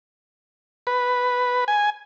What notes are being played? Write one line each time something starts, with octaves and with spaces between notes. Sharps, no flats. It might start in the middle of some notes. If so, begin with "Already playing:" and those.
B4
G#5